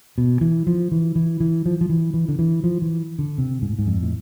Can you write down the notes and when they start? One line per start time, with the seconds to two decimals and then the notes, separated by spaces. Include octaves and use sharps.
0.18 B2
0.41 E3
0.67 F3
0.92 E3
1.16 E3
1.40 E3
1.66 F3
1.81 F3
1.89 E3
2.14 E3
2.28 D3
2.39 E3
2.64 F3
2.82 E3
3.19 D3
3.38 C3
3.62 G#2
3.70 A2
3.79 G#2
3.87 F2
4.03 A2